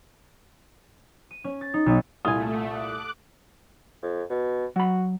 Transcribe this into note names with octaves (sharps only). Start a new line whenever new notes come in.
D#7
C#4
A6
D#4
B1
C2 A#2 A3 E4 F4 G#5 D#6
D6 F#6
F2
B2
F#3 F#4 B5